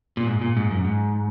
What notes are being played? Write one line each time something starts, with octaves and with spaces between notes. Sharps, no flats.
A#2
G#2
A#2
G#2
F#2
G#2